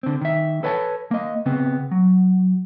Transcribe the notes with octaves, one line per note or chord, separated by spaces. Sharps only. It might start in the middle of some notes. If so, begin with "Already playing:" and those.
D3 C4
D#3 E5
A4 B4 C#5 G5 A5
A#3 D#5
C#3 B3 C4
F#3